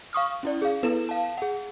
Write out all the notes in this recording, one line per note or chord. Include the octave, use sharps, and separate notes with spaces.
F5 C#6 D#6 F6
C#4 E4 D5
G#4 F5
B3 E4 A4 B4 E7
F5 A5
G#4 F#5